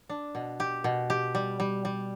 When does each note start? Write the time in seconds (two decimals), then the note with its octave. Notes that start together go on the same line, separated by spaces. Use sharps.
0.09 D4
0.35 B2
0.60 G4
0.84 B2
1.10 G4
1.35 G3
1.60 G3
1.85 G3